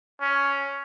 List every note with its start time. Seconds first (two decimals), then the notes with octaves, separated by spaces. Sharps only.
0.21 C#4